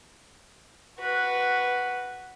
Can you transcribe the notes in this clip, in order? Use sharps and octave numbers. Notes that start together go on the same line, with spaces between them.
F#4 B4